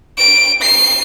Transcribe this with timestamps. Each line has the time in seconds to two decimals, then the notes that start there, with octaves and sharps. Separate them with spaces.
0.18 D7
0.62 C7